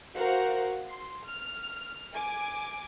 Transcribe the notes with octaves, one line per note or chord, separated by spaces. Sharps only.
F#4 A#4 C5 F5 F#5
C6
F6
G#5 D6